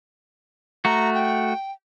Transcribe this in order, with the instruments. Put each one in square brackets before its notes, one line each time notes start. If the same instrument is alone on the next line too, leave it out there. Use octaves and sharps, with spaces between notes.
[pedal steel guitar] A3 F#4 [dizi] A#5
[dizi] G5